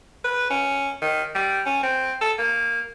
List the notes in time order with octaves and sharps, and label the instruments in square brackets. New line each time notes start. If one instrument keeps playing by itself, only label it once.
[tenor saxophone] B4
C#4
D#3
G3
C#4
C4
A4
A#3